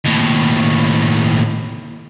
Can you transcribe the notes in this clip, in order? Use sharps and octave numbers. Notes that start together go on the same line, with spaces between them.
D#2 A2